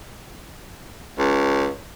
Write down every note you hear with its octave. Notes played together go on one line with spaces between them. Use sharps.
C#2